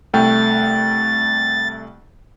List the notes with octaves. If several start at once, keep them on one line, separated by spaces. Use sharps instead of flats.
C2 A3 G5 A6